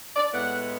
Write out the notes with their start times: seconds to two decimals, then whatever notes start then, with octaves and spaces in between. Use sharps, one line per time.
0.16 D5
0.32 A2 G#3 B3 F#5